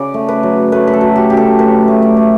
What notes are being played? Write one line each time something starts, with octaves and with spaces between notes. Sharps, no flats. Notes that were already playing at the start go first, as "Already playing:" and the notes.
Already playing: C#3 D5
A3
B4
F#3
A3 B4
B4
A4
F#3
G4
C#3 G4
A4
A2 B4
A3
D5
A3